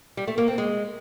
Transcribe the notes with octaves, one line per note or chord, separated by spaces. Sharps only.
G3
A3
A#3
C4
G#3